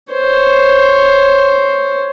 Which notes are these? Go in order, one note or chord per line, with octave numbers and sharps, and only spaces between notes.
C5 C#5